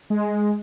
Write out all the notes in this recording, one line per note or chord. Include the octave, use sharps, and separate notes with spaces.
G#3